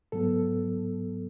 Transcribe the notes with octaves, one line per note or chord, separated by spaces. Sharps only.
G#2 F#3 B3 A4